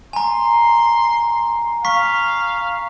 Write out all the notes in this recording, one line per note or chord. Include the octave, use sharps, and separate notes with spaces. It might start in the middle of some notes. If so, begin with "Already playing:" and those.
G#5 A#5 C6
F5 C#6 B6